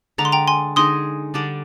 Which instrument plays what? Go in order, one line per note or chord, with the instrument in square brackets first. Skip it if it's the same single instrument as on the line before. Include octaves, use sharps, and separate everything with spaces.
[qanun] D3 G#3 D4 [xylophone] A#5
[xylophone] C6
G5 A#5
G#5 C6
[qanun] D3 G#3 D#4 G#4 [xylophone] C6 D#6
[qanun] D3 G3 D4